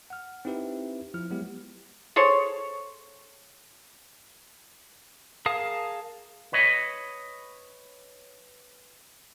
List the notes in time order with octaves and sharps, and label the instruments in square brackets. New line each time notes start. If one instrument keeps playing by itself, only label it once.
[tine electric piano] F#5 F6
C4 D#4 E4 G4 B4 E5
F3 E4 F6
F#3 G#3 B3 E4 G4
[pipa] G#4 A4 C5 C#5
[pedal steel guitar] G#4 A#4 F5 A5 D#6
[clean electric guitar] B4 C#5 D#5